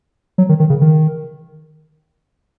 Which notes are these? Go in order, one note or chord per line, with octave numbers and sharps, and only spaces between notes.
F#3
D#3
D#3
C#3
D#3